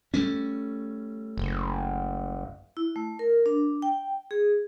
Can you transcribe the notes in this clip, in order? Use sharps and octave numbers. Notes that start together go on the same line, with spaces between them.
G3 A3 C#4
F#1
E4
A3
A#4
D4
G5
G#4